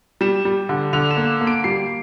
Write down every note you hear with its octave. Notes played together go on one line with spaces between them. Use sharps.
G3 E7
G3
D3
D3 F7
E7
A#3
A#3
D7
G3 C7